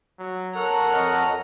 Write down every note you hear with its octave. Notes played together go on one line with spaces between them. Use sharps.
F#3
A4 A#4 C#5 F#5 A#5
F2 D#5 F6